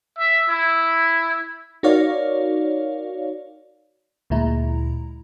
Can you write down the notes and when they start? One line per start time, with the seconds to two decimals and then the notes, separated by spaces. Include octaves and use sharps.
0.18 E5
0.49 E4
1.83 D#4 F#4 A#4 C#5 D5 F5
4.30 D2 A#2 G#3 E4 A#5